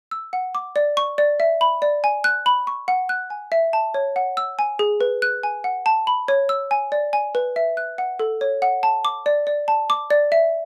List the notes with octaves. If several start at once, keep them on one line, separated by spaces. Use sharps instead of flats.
E6
F#5
D6
D5
C#6
D5
E5
B5
D5
G#5
F#6
B5
C#6
F#5
F#6
G#5
E5
A5
C#5
F#5
E6
G#5
G#4
B4
F#6
G#5
F#5
A5
B5
C#5
E6
G#5
D5
G#5
B4
E5
F#6
F#5
A4
C#5
F#5
A5
D6
D5
D5
A5
D6
D5
E5